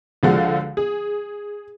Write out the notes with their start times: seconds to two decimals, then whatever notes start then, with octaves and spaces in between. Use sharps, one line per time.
0.23 C#2 D3 F3 G#3 F#4 F5
0.77 G#4